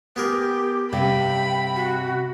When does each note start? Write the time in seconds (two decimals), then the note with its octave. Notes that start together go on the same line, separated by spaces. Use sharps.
0.16 B3 G4 G#4 A#4
0.93 G2 C3 G5 B5
1.75 F#4